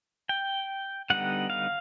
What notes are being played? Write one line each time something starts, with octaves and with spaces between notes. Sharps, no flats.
G5
D3 G3 B3 D#4 F#5
F5